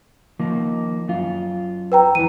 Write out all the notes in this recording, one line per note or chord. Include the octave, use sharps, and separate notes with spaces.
D#3 F3 A#3
F#2 F4
B4 G5 A#5
E2 E3 D#7